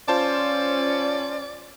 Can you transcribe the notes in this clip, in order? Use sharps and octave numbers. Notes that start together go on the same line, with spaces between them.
C#4 F4 C5 D5 A5